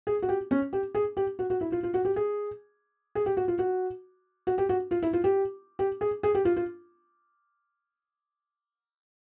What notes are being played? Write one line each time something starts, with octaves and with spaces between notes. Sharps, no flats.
G#4
F#4
G4
C#4
G4
G#4
G4
F#4
F#4
E4
F4
F4
F#4
G4
G#4
G#4
G4
F#4
F4
F#4
F#4
G4
F#4
F4
E4
F4
G4
G4
G#4
G#4
G4
F4
F4